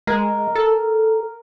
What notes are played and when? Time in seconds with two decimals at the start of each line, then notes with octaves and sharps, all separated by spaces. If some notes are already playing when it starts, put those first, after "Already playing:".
0.07 G#3 A#4
0.55 A4